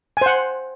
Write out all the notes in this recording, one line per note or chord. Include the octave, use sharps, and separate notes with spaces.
C5 F#5 G#5